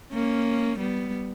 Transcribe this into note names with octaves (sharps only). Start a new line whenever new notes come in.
A#3 C#4
G3 B3